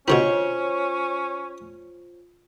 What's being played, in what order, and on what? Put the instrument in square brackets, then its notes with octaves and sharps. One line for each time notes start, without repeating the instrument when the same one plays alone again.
[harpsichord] B2 D3 C4 [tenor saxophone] C#4 [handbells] F4 [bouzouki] C5 C#5